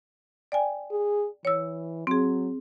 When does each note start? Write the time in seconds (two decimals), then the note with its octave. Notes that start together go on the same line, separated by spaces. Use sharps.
0.52 D5 G5 G#5
0.92 G#4
1.45 E3 C#5 E6
2.07 F#3 C4 G#4